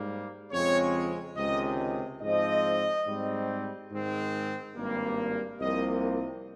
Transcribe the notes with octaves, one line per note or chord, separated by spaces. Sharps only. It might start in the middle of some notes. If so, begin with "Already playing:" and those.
Already playing: G#2 G3 A#3
F2 C#3 G#3 C4 C#5
C#2 C3 D#3 G#3 D#5
G#2 F3 C4 D#5
G#2 G3 C4
G#2 D#3 G#3 C4
G#1 G2 G3 A#3
C2 C3 F3 A#3 D#5